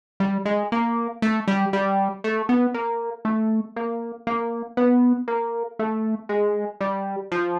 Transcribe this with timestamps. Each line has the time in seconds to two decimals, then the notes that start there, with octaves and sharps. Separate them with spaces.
0.20 G3
0.45 G#3
0.72 A#3
1.22 A3
1.48 G3
1.73 G3
2.24 A3
2.49 B3
2.74 A#3
3.25 A3
3.76 A#3
4.27 A#3
4.77 B3
5.28 A#3
5.79 A3
6.29 G#3
6.80 G3
7.32 F3